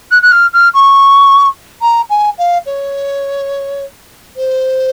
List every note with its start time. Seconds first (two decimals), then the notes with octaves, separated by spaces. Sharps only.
0.11 F#6
0.22 F#6
0.31 F6
0.53 F6
0.74 C#6
1.81 A#5
2.10 G#5
2.38 F5
2.66 C#5
4.36 C5